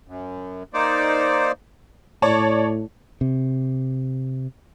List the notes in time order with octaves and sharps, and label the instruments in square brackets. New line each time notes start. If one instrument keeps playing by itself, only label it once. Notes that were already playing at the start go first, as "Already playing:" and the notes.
[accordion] F#2
A#3 D#4 C5 D5
[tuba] A2 [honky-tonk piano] C#5 D5 A5
[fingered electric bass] C3